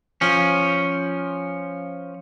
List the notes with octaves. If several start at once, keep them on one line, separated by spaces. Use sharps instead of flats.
F3 C#4